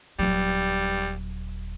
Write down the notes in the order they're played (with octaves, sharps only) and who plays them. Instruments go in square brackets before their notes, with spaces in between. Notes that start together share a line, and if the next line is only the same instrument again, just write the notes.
[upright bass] D#1 F#3 [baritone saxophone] G3